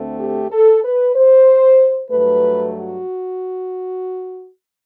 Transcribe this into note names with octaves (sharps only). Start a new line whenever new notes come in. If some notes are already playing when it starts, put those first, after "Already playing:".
Already playing: D2 D3 A3 C4
G4
A4
B4
C5
G2 F#3 A3 B4
F#4